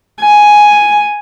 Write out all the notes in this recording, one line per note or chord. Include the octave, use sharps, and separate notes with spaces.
G#5